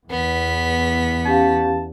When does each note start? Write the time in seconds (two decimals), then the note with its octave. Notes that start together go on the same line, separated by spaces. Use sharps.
0.10 E2 B3 B6
1.25 C#4 G4 F5 A5